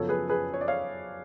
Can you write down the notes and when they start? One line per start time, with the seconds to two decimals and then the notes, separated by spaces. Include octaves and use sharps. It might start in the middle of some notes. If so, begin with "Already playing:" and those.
Already playing: F#2 C#3 F3 B3 A4 C#5
0.09 G#4 B4
0.29 G#4 B4
0.54 C#5
0.61 D5
0.68 C#5 F5